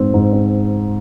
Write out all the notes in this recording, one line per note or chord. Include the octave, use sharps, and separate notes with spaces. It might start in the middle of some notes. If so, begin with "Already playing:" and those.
Already playing: G#2 C4
G#2
C4